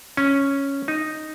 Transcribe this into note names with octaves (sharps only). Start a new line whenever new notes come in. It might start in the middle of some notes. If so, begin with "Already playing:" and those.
C#4
D#4